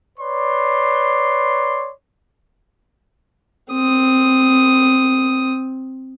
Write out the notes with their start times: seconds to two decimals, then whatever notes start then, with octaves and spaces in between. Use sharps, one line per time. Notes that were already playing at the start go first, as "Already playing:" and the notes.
0.18 B4 C#5 D5 C6
3.72 C4 D#6